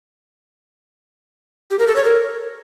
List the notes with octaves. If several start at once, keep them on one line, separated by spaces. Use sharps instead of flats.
G4
A#4
A4
C#5
A#4